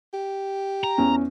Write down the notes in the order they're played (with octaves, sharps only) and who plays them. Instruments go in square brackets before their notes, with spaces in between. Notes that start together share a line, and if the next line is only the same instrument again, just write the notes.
[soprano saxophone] G4
[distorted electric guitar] A#5
[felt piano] E2 C#4